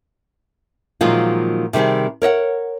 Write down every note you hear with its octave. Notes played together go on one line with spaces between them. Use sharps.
A#2 D#3 F3 F#3 G#3 F4
C3 D#3 G3 C4 G#4
A#4 C#5 D#5 F#5